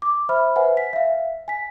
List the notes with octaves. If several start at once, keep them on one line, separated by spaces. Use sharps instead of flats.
D6
C5 E5 B5 F6
B4 C5 E5 F#5 G#5
B6
E5 F5
G#5 B6